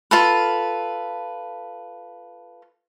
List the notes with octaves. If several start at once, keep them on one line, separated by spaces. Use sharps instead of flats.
F4 A4 B4